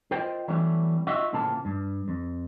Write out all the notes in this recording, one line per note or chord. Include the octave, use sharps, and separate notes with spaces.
F4 A#4 C5 D#5 G5
E3 F#3 G3 A3 B3 C#4
D#4 F4 F#4 D#5 E5
A2 C#3 F3 A#3 A5
G2
F2